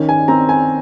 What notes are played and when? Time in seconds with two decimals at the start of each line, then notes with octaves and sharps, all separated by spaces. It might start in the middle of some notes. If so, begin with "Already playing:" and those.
Already playing: D#3 C#4
0.09 G#5
0.28 C4 A#5
0.49 G#5